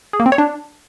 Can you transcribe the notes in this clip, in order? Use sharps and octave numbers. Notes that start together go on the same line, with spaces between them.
G#4
A#3
C4
C#5
D4